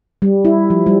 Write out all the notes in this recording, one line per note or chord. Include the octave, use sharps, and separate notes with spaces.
G3
E4
F3
G3